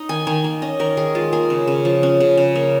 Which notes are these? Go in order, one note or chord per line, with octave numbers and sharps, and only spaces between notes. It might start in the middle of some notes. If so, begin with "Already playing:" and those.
Already playing: D#4
D#3 G#5
D#3 G#5
A#3
C#4 D#5
D#3 A#4
D#3 G#4
G#3 F4
A#3 G#4
C#3
C#3
F3
C#4
C#3
C#3
A#3